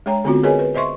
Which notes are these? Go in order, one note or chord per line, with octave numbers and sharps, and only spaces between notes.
G#3 D4 C#5 G5 A#5
D3 B3 C4 D4 F4 F#4
G#4 A#4 B4 C#5 D#5 G#5
B4
C5 D#5 E5 C6 C#6